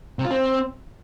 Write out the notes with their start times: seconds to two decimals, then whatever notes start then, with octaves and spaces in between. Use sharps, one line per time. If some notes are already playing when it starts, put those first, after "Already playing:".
0.19 C3
0.25 F4
0.31 C4